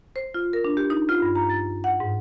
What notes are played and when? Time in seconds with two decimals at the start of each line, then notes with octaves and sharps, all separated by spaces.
0.16 C5
0.34 F4
0.53 A#4
0.65 D4
0.77 G4
0.90 D#4
1.09 F4
1.22 G2
1.35 A#5
1.50 A6
1.84 F#5
2.00 G#2